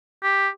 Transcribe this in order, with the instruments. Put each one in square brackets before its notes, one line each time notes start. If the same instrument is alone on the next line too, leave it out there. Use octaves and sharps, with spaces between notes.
[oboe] G4